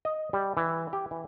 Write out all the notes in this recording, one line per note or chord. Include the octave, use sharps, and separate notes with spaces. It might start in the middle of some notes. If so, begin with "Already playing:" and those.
D#5
G3
E3
G4
E3